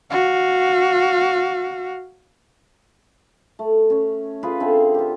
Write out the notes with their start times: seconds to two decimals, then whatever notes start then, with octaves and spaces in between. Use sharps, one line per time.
0.11 F#4 F5
3.59 A3
3.90 C#4 C#5
4.43 F4 G#4 A#4 B4
4.60 D3 C4 E5
4.94 F4 G4